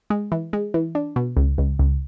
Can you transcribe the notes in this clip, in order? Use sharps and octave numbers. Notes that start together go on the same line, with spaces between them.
G#3
E3
G#3
E3
D4
B2
C#2
C#2
C#2